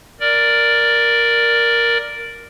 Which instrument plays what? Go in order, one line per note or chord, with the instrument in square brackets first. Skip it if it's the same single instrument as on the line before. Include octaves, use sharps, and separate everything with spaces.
[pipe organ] A#4 D5